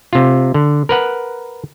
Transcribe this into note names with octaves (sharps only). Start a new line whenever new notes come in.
C3 F4
D3
A#4 B4 F#5